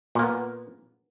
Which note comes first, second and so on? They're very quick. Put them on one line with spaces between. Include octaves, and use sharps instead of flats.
A#2 A#3 B3